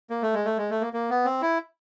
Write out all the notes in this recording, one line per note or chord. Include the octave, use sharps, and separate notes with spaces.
A#3
A3
G#3
A3
G#3
A3
A#3
A#3
B3
C4
E4